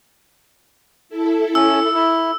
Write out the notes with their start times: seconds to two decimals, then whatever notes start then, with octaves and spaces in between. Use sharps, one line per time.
1.09 E4 A4
1.55 C#4 E6
1.95 E4